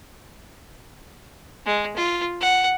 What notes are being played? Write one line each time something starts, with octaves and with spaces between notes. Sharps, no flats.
G#3
F4
F#5